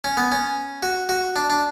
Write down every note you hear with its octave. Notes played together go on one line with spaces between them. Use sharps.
C#4
B3
C#4
F#4
F#4
D4
D4